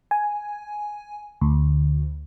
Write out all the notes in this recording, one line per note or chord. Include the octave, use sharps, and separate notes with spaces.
G#5
D2